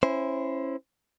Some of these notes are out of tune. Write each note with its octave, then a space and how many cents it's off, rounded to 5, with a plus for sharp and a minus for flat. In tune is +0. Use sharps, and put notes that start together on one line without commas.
C#4 -25 E4 +5 C5 -10